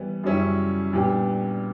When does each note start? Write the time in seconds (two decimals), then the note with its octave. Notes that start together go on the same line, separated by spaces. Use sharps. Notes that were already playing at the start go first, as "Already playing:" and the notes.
Already playing: E3 G3 B3
0.23 F#2 C#3 G3 C#4 E4
0.93 A#2 G3 B3 D4 G4